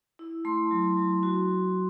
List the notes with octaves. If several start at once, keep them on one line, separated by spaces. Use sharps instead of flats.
E4
A3 C6
F#3
F#3
F#4